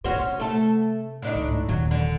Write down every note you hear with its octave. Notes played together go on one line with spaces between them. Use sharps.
C3 C#4 F#4 C5
A3 A4
A2 D4 D#4
C#2 G#2
D#1 F#3
D3